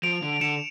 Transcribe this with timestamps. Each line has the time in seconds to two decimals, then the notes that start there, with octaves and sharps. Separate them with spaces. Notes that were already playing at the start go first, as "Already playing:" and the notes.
0.03 F3 D7 F7
0.22 D3
0.41 D3 C#7 E7